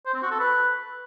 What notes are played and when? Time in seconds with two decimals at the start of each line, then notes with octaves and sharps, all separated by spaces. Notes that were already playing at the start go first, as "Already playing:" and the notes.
0.06 C5
0.14 C4
0.23 F#4
0.31 A4
0.39 B4